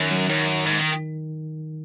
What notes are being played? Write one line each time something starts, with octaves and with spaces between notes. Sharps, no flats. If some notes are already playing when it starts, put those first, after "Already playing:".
Already playing: F#2 D#3
F#3
F#2 D#3
G#2
D#3